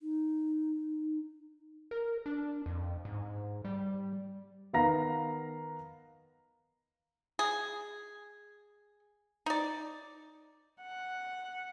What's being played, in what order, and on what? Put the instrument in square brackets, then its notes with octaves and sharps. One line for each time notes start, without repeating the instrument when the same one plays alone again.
[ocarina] D#4
[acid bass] A#4
D4
F2
G#2
G3
[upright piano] D#3 B3 F5 A#5 A#6
[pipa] G#4
D#4 D5
[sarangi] F#5